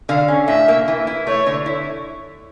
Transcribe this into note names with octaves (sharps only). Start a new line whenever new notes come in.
D3 F5
C#4
A2 E5
A#3
E3
E4
A3 C#5
D3
E4